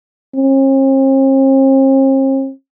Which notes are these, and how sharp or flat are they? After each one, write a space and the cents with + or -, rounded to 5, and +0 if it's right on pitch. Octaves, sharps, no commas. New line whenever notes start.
C4 +45